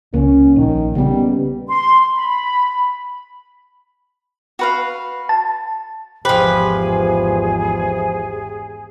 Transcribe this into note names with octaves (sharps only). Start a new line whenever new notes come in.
C#2 A#3 C#4
A#1 D#3
C#3 G3 B3
C6
B5
F#4 B4 F5
A5
G#1 E2 F3 G4 G#4 B4 C5 G5